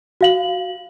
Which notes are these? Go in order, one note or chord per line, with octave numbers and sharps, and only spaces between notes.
F#4 F5 F#7